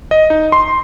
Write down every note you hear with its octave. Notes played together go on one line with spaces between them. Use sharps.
D#5
D#4
C6